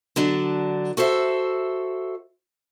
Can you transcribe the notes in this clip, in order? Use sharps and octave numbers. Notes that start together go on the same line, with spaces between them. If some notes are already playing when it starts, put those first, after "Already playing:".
D3 F#3 D4
F#4 A4 C5 E5